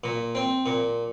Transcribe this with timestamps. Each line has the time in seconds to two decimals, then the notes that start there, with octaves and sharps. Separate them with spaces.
0.04 A#2
0.35 C4
0.66 A#2